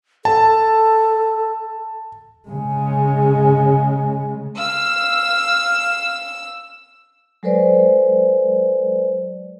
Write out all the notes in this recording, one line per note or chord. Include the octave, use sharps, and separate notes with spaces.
A4 A5
C#3 G#3
F5 E6
F#3 G#3 A4 B4 C5 D5